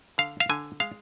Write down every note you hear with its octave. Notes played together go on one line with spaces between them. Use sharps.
D3 F5
F5
D3 G#5
G#3 F5